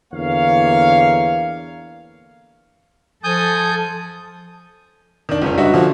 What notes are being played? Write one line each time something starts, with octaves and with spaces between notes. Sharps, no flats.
E2 D3 A#3 C#5 F5
F3 A4 G#5 D#6 G6
D#3 D4
F#1 C#2 C#4
G2 F#4 D#5 E5
D3 F3